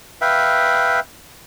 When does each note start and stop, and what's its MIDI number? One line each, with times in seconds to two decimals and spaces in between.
0.21 1.00 71
0.21 1.00 76
0.21 1.00 77
0.21 1.00 79